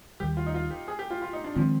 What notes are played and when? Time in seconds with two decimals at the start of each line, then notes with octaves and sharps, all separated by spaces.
0.20 D#2 D#3 G3 G4
0.37 F4
0.46 D#4
0.54 F4
0.71 G4
0.88 G#4
0.99 G4
1.11 F4
1.22 F4
1.33 D#4
1.44 D4
1.56 D#3 F3 G#3 C4